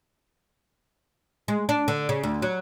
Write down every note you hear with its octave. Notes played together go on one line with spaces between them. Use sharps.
G#3
D4
D3
C#3
D2
F#3